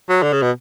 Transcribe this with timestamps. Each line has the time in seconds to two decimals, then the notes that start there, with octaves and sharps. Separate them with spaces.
0.09 F#3
0.23 D3
0.33 C#3
0.42 B2